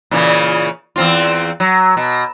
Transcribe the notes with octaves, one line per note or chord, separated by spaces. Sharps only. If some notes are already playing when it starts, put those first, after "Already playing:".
A#2 C#3 E3
E2 C4 F4
F#3
B2